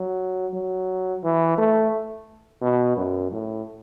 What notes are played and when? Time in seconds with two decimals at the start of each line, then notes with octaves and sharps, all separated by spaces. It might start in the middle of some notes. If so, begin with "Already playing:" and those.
Already playing: F#3
0.54 F#3
1.24 E3
1.58 A3
2.62 B2
2.97 F#2
3.32 A2